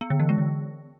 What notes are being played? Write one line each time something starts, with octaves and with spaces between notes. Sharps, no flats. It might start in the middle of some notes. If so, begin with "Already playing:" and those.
B3
D3
E3
G#3
D3